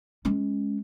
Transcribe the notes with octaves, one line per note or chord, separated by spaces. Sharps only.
G#3 C#4